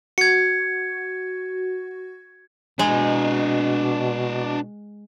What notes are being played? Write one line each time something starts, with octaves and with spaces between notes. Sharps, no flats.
F#4 G#6 C#7
B2 G#3 D4 D#5